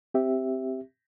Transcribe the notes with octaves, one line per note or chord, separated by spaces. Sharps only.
C4 G4 E5